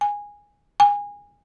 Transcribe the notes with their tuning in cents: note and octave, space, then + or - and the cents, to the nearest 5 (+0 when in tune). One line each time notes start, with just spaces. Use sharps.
G#5 -15
G#5 -25